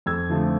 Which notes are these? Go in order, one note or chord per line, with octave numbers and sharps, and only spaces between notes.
F2 E6 G#6
D3 F3 A3